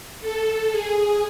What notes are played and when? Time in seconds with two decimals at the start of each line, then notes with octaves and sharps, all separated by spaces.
0.21 A4
0.71 G#4